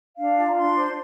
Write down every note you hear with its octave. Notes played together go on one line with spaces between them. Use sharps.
D4 F5
F4 A5
A#5
D4 C6
C5